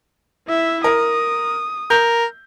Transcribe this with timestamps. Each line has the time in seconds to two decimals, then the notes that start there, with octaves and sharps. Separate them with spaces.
0.48 E4 E5
0.84 A#4 D#6
1.90 A#4 G6